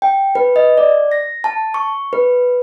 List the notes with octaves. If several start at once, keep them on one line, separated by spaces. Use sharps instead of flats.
G5
B4
D#5
D5
A#6
A5
C#6
B4